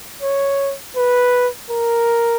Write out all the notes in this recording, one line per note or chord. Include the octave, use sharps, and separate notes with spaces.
C#5
B4
A#4